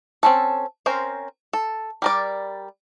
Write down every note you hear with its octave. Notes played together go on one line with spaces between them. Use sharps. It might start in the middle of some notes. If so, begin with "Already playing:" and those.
C4 C#4 A4
C4 C#4 A#4 C5
A4
G3 A#4 D5